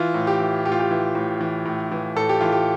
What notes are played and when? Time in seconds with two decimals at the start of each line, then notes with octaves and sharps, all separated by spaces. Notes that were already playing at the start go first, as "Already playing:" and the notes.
Already playing: E3 F4
0.14 A2
0.27 G4
0.40 E3
0.65 A2 G4
0.72 F4
0.80 G4
0.91 E3
1.15 A2
1.41 E3
1.65 A2
1.92 E3
2.16 A2 A4
2.29 G4
2.41 E3 F4
2.52 G4